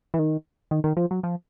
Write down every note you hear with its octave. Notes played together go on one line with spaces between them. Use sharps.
E3
D#3
D#3
D#3
F3
F#3
F3